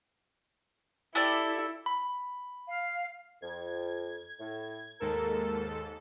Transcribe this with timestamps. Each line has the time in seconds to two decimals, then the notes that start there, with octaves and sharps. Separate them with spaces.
1.15 E4 G4 A4 D5
1.86 B5
2.68 F5
3.42 F2 G#6
4.40 A2
5.01 D#2 G#2 A4 A#4